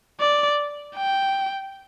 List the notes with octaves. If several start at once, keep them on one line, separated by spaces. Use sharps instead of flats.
D5
G5